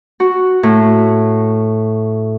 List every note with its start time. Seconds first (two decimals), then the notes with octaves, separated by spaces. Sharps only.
0.20 F#4
0.63 A2